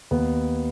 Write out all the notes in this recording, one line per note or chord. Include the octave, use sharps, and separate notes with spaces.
D#2 B3